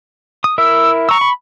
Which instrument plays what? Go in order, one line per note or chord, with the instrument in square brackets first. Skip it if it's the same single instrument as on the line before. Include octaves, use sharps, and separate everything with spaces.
[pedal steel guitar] D#6
[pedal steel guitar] E4 A#4 E5 [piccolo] E6
[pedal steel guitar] A#5 E6 [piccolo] C#6
[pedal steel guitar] B5